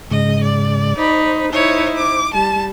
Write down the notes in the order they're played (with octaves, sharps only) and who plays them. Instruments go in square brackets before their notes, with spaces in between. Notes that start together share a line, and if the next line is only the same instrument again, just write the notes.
[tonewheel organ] G#2 C#3 G#3 [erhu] D#5
[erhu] D5
[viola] D#4 B5 [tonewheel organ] C5
[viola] D#4 E4 [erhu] C#5
[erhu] D6
[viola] G3 [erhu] A5